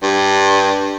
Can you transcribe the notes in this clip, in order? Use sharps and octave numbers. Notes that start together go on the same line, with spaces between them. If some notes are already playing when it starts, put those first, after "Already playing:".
G2